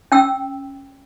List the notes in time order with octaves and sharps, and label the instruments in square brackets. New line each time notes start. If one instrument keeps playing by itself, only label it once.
[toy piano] C#4 G5 E6